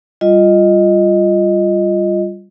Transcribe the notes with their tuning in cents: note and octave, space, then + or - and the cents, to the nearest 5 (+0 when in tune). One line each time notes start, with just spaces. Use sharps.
G3 +0 F4 +0 D#5 +0